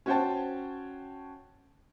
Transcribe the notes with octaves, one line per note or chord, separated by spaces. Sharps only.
C#4 F#4 C5 G5 A5